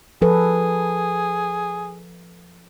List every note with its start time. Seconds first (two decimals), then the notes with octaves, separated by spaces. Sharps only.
0.22 F3 G#4 A4 B4